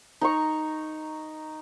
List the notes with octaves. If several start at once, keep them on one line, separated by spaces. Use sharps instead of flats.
D#4 A#5 C#6